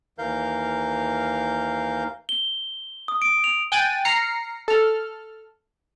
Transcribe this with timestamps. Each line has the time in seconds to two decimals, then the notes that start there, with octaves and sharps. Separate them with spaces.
0.18 D#2 E3 A#4 F5 G6
2.29 G7
3.08 D#6
3.22 D7
3.44 F7
3.72 G5 G#5 F#6 A6 D7 D#7
4.05 A#5 F6 C7 C#7
4.68 A4 F6